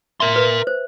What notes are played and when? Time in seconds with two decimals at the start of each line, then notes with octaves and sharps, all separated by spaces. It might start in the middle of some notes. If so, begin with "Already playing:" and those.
0.20 A#4 E5 C6
0.36 B4
0.67 C5